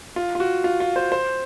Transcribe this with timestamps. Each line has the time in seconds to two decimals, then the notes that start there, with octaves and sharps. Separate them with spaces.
0.16 F4
0.35 F4
0.40 F#4
0.64 F4
0.80 F4
0.96 C5
1.12 C5